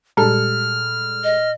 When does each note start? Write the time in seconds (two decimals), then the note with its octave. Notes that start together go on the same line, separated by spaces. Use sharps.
0.17 A#2 G3 G#3 A4 A5 F6
1.24 D#5